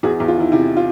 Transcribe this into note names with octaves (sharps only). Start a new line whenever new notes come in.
E2 F#4 G#4
E2
F4
D#3 E4
C3 E4
F4